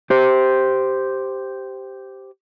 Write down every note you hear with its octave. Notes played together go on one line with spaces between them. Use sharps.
G4 C5